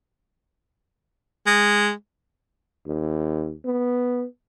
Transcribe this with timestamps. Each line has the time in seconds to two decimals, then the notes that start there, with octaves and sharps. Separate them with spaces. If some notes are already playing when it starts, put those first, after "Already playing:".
1.47 G#3
2.86 D#2
3.65 B3